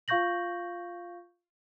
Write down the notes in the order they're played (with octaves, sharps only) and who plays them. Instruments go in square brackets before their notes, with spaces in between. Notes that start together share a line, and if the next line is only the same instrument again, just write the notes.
[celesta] F4 F5 C#6 G6 A#6 F#7